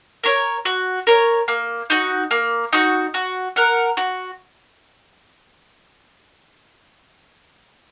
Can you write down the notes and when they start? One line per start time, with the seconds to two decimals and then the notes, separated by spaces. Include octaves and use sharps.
0.24 A#4 C#5
0.65 F#4
1.07 A#4 C#5
1.48 A#3
1.90 D#4 F#4
2.31 A#3
2.73 D#4 F#4
3.14 F#4
3.56 A#4 F#5
3.97 F#4